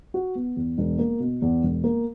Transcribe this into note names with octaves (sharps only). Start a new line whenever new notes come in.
F#4
B3
E2
E1
A#3
B2
E2
E1
A#3